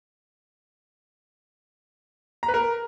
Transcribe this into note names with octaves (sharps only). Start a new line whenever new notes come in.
A#5
B4
A#4